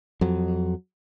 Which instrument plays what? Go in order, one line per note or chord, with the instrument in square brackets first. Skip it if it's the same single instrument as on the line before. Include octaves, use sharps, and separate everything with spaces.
[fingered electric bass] F2 F#3